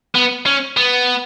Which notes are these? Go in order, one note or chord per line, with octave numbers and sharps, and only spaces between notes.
B3
C#4
B3